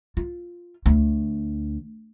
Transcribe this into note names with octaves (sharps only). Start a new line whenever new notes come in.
F4
D2